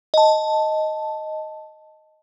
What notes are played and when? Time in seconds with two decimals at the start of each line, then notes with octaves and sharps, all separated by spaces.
0.14 D#5 A5